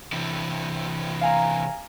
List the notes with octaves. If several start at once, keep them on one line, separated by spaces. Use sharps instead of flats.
C3 E3
F5 G#5 A#5